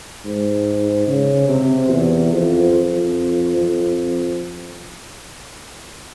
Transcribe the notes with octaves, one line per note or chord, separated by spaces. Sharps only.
G#2
C#3
C3
E2
F2
F2
F2